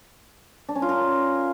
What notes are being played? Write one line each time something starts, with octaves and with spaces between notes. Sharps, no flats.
D4
C#4
F4
A#4